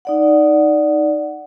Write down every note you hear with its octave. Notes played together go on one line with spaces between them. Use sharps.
D#4 D5 F#5